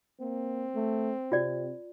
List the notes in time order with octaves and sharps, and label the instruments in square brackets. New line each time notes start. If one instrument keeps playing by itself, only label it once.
[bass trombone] A#3 [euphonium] C4
[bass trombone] A3
[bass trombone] C3 [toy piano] F4 D5